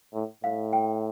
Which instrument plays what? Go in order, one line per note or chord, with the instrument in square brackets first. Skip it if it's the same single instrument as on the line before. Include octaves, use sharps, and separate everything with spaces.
[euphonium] A2
[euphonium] A2 [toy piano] F5
[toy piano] G5